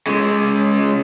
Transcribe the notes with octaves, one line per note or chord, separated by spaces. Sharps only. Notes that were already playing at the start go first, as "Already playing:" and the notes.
C#3 G#3